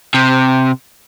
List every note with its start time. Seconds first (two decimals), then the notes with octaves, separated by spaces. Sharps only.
0.14 C3